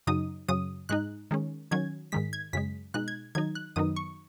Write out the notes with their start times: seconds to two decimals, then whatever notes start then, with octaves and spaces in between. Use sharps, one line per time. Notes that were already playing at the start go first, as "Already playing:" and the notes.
0.07 F#2 C#3 F#3 D#4 D#6
0.48 F#2 C#3 F#3 D#6
0.89 G#2 G#3 D#4 F#6
1.31 D#3 G#3 C#4
1.71 D#3 F#3 C#4 G#6
2.12 G#2 D#3 G#3 B6
2.33 G#6
2.53 F#2 C#3 G#3 B6
2.94 B2 G#3 D#4 F#6
3.08 G#6
3.35 D#3 F#3 D#4 G#6
3.55 F#6
3.76 F#2 D#3 F#3 B3 D#4 D#6
3.96 C#6